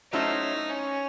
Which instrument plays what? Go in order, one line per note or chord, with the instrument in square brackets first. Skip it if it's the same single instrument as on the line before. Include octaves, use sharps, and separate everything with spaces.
[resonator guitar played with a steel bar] F#3 A3 C#4 E4 C5 [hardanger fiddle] D#4
[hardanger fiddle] C#4